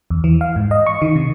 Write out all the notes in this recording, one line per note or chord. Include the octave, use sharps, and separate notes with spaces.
E2
E3
F5
G#2
D#5
C#6
D#3
C3